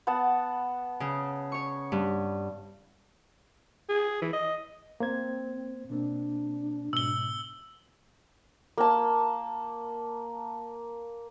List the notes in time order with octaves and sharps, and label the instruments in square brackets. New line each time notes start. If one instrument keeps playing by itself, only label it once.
[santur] B3 F#5 A5
[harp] C#3
C#5 C#6
G2
[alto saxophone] G#4
E3
D#5
[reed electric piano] A#3 C5 G#6 [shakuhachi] C4
[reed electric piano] B2 A#3 C4 [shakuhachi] D4
[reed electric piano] G#2 B2 [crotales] E6 G7
[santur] A#3 A5